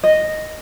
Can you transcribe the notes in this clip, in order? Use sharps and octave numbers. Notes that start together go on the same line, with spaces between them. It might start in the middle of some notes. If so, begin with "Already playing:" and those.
D#5